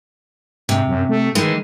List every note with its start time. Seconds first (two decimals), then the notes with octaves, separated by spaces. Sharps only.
0.69 G#2 C3
0.87 F#2
1.09 A3
1.35 D#3 E3 G#3